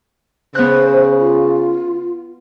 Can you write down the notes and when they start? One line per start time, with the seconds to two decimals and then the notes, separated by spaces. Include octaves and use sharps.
0.55 C#3 B3 C5 F#6
1.18 F4